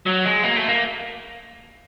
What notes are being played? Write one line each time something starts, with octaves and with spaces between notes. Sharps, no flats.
F#3
G#3
A#3
A3
A#3